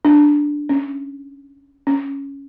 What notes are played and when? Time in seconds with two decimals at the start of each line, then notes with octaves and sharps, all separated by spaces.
0.05 D4
0.69 C#4
1.87 C#4